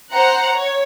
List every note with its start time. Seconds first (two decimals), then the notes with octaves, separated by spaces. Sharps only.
0.12 C5 F#5 A#5
0.54 C#5